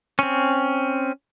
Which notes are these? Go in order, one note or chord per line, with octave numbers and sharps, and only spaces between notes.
C4 C#4